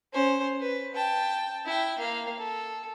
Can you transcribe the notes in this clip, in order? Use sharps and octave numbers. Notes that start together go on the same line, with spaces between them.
C#4 C5
B4
G5 A5
E4 G5
A#3 F5
A4